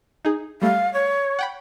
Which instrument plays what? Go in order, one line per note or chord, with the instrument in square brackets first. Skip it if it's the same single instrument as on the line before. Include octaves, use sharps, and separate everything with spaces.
[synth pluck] D#4 G#4
[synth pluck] G3 A3 [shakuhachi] F5
[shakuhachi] C#5
[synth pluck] F#5 G5 B5